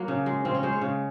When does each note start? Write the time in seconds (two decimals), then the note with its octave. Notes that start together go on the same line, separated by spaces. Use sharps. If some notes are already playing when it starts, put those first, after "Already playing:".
Already playing: F#3 A#3
0.08 C#3
0.26 G#3
0.45 C#3 C4
0.55 C#4
0.63 G#3 C5
0.73 C#5
0.82 C#3